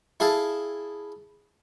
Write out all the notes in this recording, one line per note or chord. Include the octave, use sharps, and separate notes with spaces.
E4 G#4 A4 F5 A5